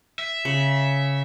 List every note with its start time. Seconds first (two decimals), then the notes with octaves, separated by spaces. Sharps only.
0.19 E5
0.45 C#3